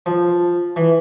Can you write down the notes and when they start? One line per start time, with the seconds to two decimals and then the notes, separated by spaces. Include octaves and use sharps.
0.06 F3
0.76 E3